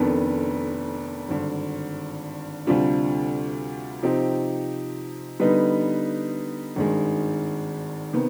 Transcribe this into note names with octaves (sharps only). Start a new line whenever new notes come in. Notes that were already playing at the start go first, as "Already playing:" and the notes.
Already playing: F1 F2 D#3 B3 D4
G#1 G2 D3
D2 C3 G3 D4 F4
C3 F3 C4 D#4 G4
D3 G3 B3 D#4 B4
G#1 G2 D#3 G#3
C3 D#3 B3